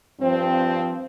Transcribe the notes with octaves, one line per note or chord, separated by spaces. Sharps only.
G2 F3 C4